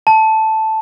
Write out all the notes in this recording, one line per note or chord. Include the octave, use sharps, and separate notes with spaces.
A5